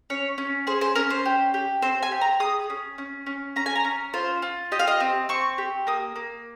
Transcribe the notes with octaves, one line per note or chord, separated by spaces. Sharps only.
C#4 C#5
C#4
G#4 C5
C5
C#4 A#4
C5
G4
G4
C4 C5
G#5
G4
A#5
G#4 D#6
C#4
C#4
C#4
C#4 A#5
G#5
A#5
C#4
F4 C5
F4
G4 D#5
F5
D#5
C4
C4 C#6
G4
A#3 D#6
A#3